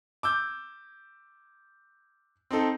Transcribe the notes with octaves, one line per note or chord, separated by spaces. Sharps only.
D6 E6 G6
C4 D#4 A4